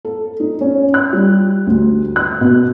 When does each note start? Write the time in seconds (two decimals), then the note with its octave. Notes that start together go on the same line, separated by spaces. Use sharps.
0.05 A4
0.40 D#4
0.61 C#4
0.94 F#6
1.13 G3
1.67 D2
2.16 F#6
2.41 B2